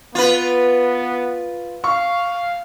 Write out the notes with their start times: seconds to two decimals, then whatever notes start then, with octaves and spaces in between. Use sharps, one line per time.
0.15 B3 F4 B4
1.84 F5 C#6